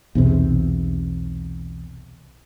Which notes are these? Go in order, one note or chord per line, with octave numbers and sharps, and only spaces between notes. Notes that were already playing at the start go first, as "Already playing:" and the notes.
B1 E2 C3